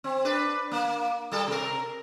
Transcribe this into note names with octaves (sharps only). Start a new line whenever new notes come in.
C4
D4 B4
A#3
G3 A4
C3 A#4